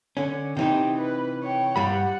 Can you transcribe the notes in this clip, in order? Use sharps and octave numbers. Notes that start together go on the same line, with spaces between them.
D3 C#4
C3 E3 D#4 G5
B4
C#5 G5
G2 G3 F#5 B5